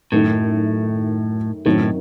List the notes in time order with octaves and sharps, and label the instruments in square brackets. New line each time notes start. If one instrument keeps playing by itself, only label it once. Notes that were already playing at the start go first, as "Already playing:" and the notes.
[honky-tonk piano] F#2 D#3 A3 [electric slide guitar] A2
[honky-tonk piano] F#2 D#3 F#3 C4 [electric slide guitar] A2